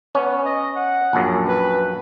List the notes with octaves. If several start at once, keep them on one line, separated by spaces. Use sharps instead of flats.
B3 C#4
D#5
F#5
A#1 F#2
B4